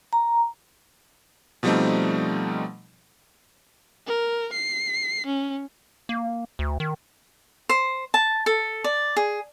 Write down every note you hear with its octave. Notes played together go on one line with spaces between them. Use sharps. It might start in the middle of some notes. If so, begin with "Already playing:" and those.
A#5
B2 F3 G3 A3 C4 D#4
A#4
C7
C#4
A#3
D2
D#3
C5
A5
A4
D5
G#4